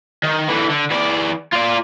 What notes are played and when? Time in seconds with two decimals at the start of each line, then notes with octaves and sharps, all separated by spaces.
0.23 D#3
0.48 D3 E3
0.70 D3
0.91 E3 D5
1.53 F4 D5